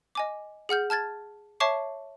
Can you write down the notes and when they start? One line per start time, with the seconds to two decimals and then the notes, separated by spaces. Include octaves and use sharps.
0.15 D#5 G#5 D6
0.69 G#4 F#5 F6 G6
0.90 A5 F6 G#6 A6
1.60 C#5 E5 A5 C#6 D6 C7